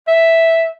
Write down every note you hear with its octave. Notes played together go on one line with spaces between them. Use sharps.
E5